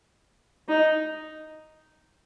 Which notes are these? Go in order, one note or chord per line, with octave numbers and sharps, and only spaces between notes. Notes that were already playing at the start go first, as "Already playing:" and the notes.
D#4